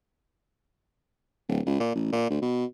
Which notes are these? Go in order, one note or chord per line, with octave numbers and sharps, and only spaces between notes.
D1
C#2
A#2
A1
A#2
D2
B2